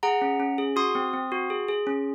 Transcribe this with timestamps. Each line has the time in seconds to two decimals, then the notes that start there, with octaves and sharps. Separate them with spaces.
0.03 G#4 F#5 A#5
0.22 C#4
0.40 C#4
0.58 G#4
0.76 F#4 C6 D#6
0.95 C4
1.13 C4
1.32 F#4
1.50 G#4
1.68 G#4
1.87 C#4